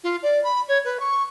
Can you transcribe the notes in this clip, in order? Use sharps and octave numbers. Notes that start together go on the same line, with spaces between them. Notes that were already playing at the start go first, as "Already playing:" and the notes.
F4
D5
B5
C#5
B4
C#6